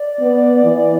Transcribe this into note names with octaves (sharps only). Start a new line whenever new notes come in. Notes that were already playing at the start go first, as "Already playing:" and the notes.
Already playing: D5
B3
E3